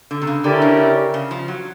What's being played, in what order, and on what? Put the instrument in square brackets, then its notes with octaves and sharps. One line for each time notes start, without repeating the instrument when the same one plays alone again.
[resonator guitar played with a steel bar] D3
C3
C#3
[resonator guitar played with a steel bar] D3 [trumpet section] C#4 E4 G4 A#4 D5
[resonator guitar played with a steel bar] C#3
C#3
F3
F#3